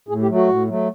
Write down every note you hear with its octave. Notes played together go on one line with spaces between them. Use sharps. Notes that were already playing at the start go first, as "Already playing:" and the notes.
A2 G#4
G4
F#3 A3
F#4
A2
F#3 A3